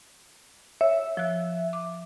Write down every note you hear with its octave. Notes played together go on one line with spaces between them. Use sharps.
C#5 E5
F3 F#6
D6